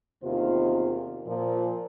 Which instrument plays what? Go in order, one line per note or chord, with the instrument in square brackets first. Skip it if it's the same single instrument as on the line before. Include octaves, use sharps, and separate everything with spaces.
[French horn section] E2 C3 D#3 A#3 F4 C5
A#2 F3